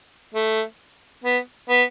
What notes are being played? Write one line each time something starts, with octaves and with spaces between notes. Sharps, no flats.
A3
B3
B3